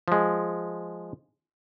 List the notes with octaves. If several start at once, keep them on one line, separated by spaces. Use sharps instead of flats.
F3 G#3